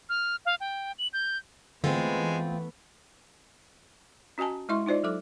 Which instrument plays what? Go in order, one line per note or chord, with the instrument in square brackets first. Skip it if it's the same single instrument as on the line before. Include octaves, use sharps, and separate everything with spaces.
[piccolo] F6
F5
G5
F#7
G6
[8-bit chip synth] D3 [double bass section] E3 A3 B3 [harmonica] G#3 [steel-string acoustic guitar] C4 F4
[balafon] C#4 F#4 D#5 G#5 A5
G#3 E4 D#5 E5 C6 C#6
D#4 F4 C5 D5 D#5
F#3 A4 D6